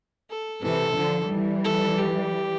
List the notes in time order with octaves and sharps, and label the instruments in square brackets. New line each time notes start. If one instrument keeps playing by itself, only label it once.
[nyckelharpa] A4
[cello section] C3 E3 [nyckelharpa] A4
[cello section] D3 F3
E3 G3
[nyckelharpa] A4
G4